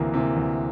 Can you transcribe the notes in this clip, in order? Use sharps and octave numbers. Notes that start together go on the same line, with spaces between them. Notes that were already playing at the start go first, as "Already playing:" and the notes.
Already playing: D2 C3 E3 A#3
C3 E3 A#3
D2